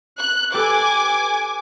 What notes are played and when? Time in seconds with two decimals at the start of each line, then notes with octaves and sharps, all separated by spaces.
0.20 F#6
0.54 G4 A4 B4 G#5 D6